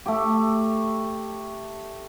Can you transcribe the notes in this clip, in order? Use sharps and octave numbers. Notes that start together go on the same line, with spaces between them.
A3 G4